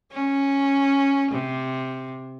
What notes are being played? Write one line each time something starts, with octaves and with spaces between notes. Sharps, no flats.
C#4
C3